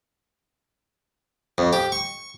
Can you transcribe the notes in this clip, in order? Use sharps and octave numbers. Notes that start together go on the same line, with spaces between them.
F2
G4
C#6